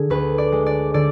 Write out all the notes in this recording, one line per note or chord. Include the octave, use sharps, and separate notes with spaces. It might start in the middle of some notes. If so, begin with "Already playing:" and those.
Already playing: D3 G#4
D2 B4
D5
G#3
D5
D3 D5